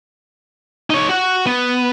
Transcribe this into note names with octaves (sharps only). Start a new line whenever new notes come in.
D#4 C#5
F#4 F#5
B3